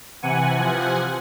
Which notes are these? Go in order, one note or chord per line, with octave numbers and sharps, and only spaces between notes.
C3 E3 F#5 G#5
C3 F3 F#5 G#5